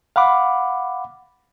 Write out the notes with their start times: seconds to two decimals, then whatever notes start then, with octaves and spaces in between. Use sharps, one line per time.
0.16 F5 F#5 B5 D6